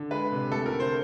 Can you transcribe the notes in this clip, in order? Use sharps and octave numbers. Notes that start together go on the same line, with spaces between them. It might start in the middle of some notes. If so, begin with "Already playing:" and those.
Already playing: D3
G#3 B4
C3
A3 A4
A#4
D3
C5